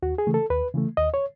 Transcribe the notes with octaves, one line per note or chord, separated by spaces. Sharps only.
D#2 F#4
G#4
C#3 E3 A3
A4
D#2 B4
C#3 E3 A3
D#2 D#5
C#5